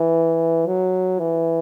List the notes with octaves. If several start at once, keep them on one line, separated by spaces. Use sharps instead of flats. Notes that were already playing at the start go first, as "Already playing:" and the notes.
Already playing: E3
F#3
E3